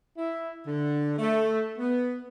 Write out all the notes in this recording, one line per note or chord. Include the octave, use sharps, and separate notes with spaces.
E4
D3
A3
B3